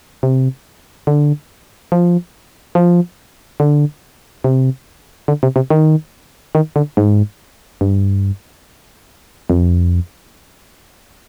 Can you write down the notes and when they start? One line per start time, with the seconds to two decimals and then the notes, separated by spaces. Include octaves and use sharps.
0.23 C3
1.07 D3
1.92 F3
2.75 F3
3.60 D3
4.44 C3
5.28 D3
5.43 C3
5.56 C3
5.70 D#3
6.55 D#3
6.76 D3
6.97 G#2
7.81 G2
9.50 F2